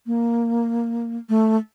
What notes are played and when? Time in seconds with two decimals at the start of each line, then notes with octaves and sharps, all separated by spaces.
0.07 A#3
1.29 A3